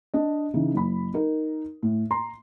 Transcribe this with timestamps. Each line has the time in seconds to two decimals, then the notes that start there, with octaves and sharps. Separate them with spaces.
0.14 D4 D#5
0.54 C#3 E3 D#4
0.74 F#1 B5
1.14 D#4 A#4
1.83 A2
2.11 A#5 C6